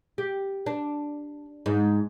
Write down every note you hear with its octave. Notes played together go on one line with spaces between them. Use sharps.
G4
D4
G#2